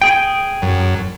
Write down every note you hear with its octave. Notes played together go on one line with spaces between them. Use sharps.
G#4 G5
F#2